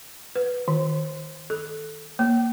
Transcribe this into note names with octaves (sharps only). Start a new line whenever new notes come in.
B4
D#3
A4
A#3